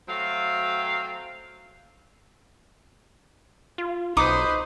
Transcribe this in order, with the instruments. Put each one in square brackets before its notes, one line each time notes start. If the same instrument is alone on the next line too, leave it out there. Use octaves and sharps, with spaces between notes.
[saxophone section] F#3 A3 C4 F5
[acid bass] F4
[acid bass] B1 [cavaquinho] D#4 D6 D#6 [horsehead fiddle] B4 C5